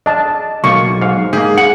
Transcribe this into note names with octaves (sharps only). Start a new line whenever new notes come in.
D4 D#5 A5
B1 A#3 F4 C#6
G#2 F5
G#2 A#3 G4 G#4
F#5